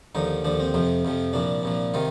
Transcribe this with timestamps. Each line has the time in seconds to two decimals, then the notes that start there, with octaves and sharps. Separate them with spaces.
0.15 D#2 D3 F3 D#4
0.44 D#2 D3 F3 D4
0.60 C4
0.74 F2 C3 F3
1.05 F2 C3 F3
1.33 C2 A#2 F3 D4
1.63 C2 A#2 F3
1.94 C3 D#3 F4